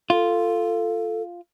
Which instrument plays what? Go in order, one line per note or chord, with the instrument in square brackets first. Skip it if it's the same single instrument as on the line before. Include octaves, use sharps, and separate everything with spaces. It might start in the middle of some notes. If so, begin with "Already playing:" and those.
[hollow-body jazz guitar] F4 [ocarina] A4